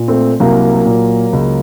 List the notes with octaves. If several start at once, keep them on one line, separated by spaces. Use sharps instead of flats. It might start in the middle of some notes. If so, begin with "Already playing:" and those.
Already playing: A#2
A3 C4
C2 F#3 A#3
A#2
C#2